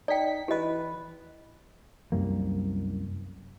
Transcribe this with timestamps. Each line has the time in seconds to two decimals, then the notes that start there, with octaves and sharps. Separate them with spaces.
0.08 D#4 D5 G5 B6
0.48 E3 G4 B4 D#5
2.12 C2 F#2 G3 A#3